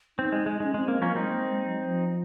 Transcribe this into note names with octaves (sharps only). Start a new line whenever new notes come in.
C4 D#4
G#3
G#3
G#3 C#4
G#3 C4
A#3
F3 A#3 C#4
F#3
G#3 C4 D#4
A#3
G#3
F#3
F3